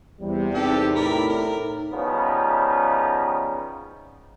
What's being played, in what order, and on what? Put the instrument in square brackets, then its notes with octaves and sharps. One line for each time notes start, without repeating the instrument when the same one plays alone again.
[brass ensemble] E2 C3 [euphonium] G3
[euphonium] C4 [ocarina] D#4 [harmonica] G4 A4 D5
[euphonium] A2 [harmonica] A#4 D5 B5
[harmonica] A#4
[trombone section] C#3 F3 G3 B3 D#4